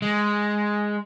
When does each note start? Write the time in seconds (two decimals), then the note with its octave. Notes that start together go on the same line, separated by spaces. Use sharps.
0.02 G#3